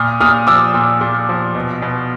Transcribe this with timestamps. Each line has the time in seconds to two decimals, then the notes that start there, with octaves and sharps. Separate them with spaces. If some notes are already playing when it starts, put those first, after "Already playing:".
Already playing: A#2 D#6 F6
0.20 A#2 D#6 F6
0.47 F3 D6 E6
0.74 A#2
1.01 A#2
1.29 F3
1.55 B2
1.82 B2